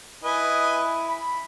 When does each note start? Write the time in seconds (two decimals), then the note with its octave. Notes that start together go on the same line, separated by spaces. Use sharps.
0.24 E4 B4 D#5 G#5
1.08 B5